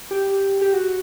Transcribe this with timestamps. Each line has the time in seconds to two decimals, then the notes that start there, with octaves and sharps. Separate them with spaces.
0.11 G4
0.61 G4
0.74 F#4